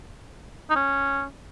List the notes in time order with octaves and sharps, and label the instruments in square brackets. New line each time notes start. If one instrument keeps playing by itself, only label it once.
[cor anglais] D#4
C#4